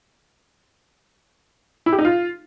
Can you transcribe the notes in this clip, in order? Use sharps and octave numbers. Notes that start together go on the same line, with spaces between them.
E4
G4
D#4
F4